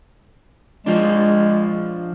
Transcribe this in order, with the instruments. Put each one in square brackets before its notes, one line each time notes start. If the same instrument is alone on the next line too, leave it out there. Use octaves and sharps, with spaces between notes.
[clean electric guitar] F3 D4 [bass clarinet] G#3